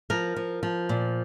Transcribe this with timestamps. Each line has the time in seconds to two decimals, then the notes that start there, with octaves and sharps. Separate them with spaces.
0.10 F3 A#4
0.36 F3
0.63 F3
0.89 A#2